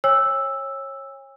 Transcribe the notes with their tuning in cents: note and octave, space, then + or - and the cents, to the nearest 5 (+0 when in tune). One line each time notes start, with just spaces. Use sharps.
C#5 -25 G#5 -45 E6 +0